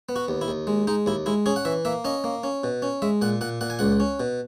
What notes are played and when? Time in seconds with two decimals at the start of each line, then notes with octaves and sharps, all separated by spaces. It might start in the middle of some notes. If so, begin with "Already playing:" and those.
0.09 B3
0.16 F#4
0.28 D#2
0.41 E4
0.48 D#2
0.67 G#3
0.87 G#3 D#4
1.06 D#2 E4
1.26 G#3 E4
1.46 C#4 G#4
1.56 F#5
1.65 E3 E5
1.85 A#3 E5
2.04 C#4 D#5
2.24 A#3
2.43 C#4
2.63 B2
2.82 C#4
3.02 G#3 E5
3.22 A#2 F#5
3.41 A#2 F#5
3.61 A#2 F#5
3.70 G#5
3.79 C#2 F#5
4.00 C#4
4.20 B2